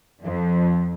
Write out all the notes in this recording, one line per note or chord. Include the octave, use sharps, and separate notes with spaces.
F2